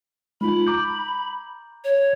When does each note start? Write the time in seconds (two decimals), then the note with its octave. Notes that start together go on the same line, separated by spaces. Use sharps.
0.41 G#3 D#4 F4 B5
0.67 A#5 D6 G6
1.84 C#5